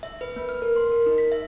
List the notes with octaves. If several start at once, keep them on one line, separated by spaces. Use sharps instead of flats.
E5
B4
A#3
F6
A#4
C6
A#4
D#4
B6
E5